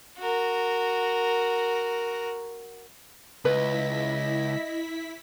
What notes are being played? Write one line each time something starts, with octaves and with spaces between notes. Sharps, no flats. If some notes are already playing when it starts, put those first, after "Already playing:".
F#4 A#4
C#2 E4 B4 D#5 B6